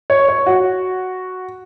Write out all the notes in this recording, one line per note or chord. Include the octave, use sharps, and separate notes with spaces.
C#5
C#5
F#4